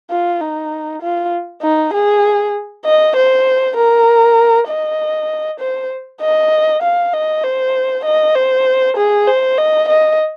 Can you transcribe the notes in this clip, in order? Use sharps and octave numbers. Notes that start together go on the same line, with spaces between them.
F4
D#4
F4
D#4
G#4
D#5
C5
A#4
D#5
C5
D#5
F5
D#5
C5
D#5
C5
G#4
C5
D#5
D#5